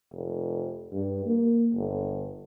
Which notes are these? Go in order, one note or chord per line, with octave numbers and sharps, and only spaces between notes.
F1
G2
A#3
G1